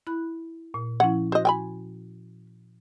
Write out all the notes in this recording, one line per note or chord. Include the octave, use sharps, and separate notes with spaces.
E4 B5 F#6
A#2
F3 C#4 E4 F#5
F#4 C5 D#5
G5 G#5 B5